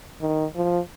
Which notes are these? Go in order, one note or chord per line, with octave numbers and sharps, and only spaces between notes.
D#3
F3